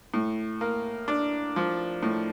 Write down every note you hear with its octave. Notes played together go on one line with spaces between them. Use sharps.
A2
A#3
D4
F3
A2